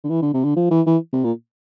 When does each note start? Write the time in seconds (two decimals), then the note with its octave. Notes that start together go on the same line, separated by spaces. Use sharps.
0.04 D3
0.10 E3
0.22 D3
0.34 C3
0.44 D3
0.56 F3
0.71 E3
0.86 E3
1.13 C3
1.24 A#2